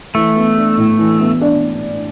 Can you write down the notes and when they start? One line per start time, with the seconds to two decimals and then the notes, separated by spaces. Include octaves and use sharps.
0.15 E3 A3
0.36 B3
0.57 D4
0.78 A2
0.98 E3
1.20 B3
1.41 D4